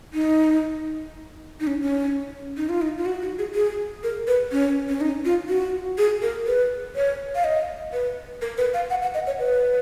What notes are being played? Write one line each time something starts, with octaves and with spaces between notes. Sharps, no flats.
D#4
D#4
C#4
C#4
D#4
F4
D#4
F4
F#4
F#4
G#4
G#4
A#4
B4
C#4
C#4
D#4
F4
F#4
G#4
A#4
B4
C#5
F5
D#5
B4
A#4
B4
F5
F#5
F#5
D#5
C#5
B4